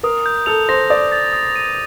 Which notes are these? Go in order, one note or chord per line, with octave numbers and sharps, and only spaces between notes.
A#4 D#6
G6
A4 F7
C5 A#6
D5 D#6
A6
D#6
D#7